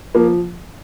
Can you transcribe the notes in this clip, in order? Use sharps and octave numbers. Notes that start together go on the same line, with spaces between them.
F3 A#3